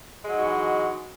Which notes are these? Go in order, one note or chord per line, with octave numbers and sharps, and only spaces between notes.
E3 F#3 G#3 D#4 F#4